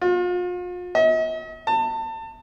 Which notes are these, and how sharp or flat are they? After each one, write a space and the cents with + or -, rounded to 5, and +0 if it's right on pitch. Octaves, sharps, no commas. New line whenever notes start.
F4 +40
D#5 +45
A5 +30